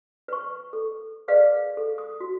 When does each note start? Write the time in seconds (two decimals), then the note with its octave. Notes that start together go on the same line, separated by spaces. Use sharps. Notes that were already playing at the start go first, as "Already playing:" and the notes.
0.28 B4 C#6
0.73 A4
1.28 G#4 A#4 B4 D5 D#5 F5
1.77 A4
1.98 D#6
2.20 F#4